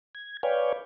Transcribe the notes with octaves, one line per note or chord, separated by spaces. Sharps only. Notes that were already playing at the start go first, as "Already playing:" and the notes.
G#6
B4 C#5 D5 F5 G5 G#5